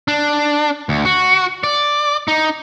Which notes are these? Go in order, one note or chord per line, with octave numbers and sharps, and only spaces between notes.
D4
D2
F#4
D5
D#4